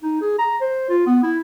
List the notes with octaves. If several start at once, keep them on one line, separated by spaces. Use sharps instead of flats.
D#4
G#4
A#5
C5
F4
B3
E4